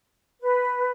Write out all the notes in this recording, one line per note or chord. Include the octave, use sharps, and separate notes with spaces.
B4